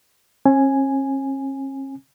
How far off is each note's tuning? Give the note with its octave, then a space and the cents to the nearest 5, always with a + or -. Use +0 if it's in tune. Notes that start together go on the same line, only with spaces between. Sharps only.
C#4 -45 G#5 +0